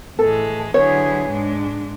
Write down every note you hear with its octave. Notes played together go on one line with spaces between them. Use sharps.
A2 E3 G#3 A4
D3 F#3 B3 E4 G#4 C#5
G#2 G#3 D4